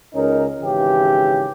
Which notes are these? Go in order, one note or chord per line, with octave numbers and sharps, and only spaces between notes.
C#2 C#4 D#4 A#4
G#1 C#3 E3 G4